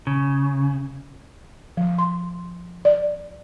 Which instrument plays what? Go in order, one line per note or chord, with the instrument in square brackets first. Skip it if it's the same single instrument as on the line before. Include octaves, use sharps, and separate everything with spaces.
[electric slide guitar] C#3
[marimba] F3
C6
D5